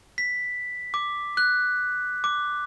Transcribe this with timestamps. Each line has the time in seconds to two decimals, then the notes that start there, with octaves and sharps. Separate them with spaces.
0.18 B6
0.94 D6
1.37 F#6
2.24 D6